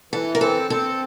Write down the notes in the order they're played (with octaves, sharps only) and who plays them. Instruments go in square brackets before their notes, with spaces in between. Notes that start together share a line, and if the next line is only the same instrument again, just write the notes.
[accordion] E3 [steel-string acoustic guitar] A4
[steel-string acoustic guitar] A#4
[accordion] C4 [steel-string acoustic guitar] A4
[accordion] C4 [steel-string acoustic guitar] A4